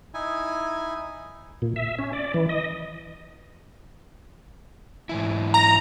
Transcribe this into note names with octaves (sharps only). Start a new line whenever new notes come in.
D#4 E4 G#5
A#2
E5
C#4
D5
E3
D#5
G#2 E3 E4
A#5